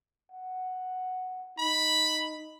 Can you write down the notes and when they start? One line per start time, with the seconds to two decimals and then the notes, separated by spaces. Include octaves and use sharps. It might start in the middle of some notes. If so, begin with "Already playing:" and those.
0.32 F#5
1.59 D#4 B5